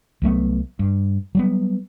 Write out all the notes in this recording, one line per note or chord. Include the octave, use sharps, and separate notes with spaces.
C2 F#3 A3 B3
G2
F#3 G3 B3